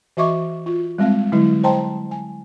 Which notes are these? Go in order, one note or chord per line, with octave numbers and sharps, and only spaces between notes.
E3 F#4 D#5 E5 C#6 D6
F4
G3 G#3 C4 F5
D3 F#3 G#3 E4
C5 D#5 G5 A5 A#5 C6
G#5